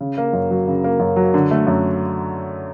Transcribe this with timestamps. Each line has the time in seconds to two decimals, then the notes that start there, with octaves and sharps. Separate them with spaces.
0.01 C#3
0.18 A#3
0.33 F#2
0.51 F#3
0.68 C#3
0.84 A#3
1.00 F#2
1.16 F#3
1.34 D3
1.51 A3
1.67 F#2